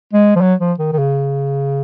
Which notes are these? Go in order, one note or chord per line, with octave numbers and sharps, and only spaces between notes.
G#3
F3
F#3
F3
D#3
D#3
C#3